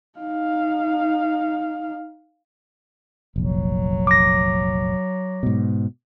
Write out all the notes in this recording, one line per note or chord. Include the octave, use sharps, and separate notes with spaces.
D#4 F5
F1 A#1 F#3
D6 A#6
G#2 B2